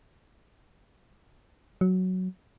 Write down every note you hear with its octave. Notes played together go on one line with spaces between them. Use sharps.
F#3